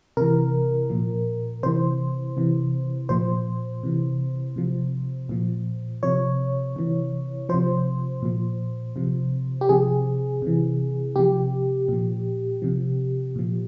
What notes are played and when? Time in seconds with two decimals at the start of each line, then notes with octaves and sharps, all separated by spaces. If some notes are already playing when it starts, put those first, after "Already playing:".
0.17 C3 E3 A#4
0.90 A#2 F3
1.63 C3 E3 C5
2.37 C3 E3
3.09 A#2 F3 C5
3.83 C3 E3
4.56 C3 F3
5.29 A#2 F3
6.03 C3 F3 C#5
6.76 C3 E3
7.49 C3 F3 C5
8.22 A#2 F3
8.96 C3 F3
9.61 G4
9.69 C3 F3 G#4
10.42 C3 E3
11.16 C3 F3 G4
11.88 A#2 F3
12.62 C3 F3
13.36 A#2 F3